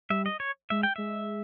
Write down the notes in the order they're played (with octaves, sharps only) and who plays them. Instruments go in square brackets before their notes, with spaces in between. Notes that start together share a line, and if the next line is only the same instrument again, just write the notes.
[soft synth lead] G3 [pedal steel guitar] E5
[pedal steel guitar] D#5
C#5
[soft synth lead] G#3 [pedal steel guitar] E5
[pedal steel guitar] G5
[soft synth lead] G#3 [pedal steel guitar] E5